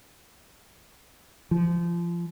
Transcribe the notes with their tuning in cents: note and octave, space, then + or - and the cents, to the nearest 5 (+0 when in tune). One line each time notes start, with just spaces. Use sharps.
F3 -25